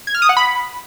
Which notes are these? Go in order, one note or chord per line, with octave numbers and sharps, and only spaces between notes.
G#6
F6
D#6
F#5
B5